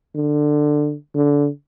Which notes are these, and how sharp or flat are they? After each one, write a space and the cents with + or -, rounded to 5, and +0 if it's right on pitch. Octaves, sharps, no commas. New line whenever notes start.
D3 +15
D3 -20